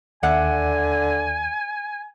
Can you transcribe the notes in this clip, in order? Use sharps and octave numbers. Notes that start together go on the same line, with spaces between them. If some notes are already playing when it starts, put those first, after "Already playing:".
D#2 D3 D5 E5 F#5 G#5